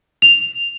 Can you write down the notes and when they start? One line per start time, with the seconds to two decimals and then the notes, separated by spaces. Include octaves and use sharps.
0.22 F7